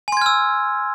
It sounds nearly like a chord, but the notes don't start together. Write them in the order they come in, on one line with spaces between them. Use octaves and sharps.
G#5 C6 G#6 F6 E6